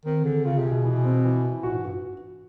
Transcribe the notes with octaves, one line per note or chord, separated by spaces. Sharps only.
D#3 C4
D3 G#4
C#3 F4
C3
G#4
B2
E3
C4
E3
E3
A#2 F#4
G#2
G2 F#4